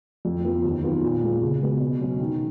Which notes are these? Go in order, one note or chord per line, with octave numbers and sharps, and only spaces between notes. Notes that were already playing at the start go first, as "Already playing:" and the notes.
F2
F3 B3
D#2
D#3 F#3 B3 F4
A#2
G#3 B3 F4
C#3
G#3 B3 F#4
B2
F#3 C#4 F#4
D#3